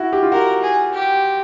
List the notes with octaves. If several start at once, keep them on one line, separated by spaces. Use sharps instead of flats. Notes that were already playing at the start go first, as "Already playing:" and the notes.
Already playing: E4 F#4
G4
F4
F#4 A#4
G#4
G4